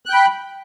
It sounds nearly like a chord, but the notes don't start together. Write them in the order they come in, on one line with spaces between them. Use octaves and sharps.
F#6 G5 B5